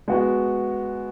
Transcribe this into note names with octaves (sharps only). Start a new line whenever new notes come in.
G#3 B3 F#4